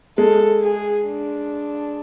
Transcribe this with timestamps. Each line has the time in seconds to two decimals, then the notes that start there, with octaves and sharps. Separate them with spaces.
0.18 G#3 A4
0.62 G#4
1.06 D4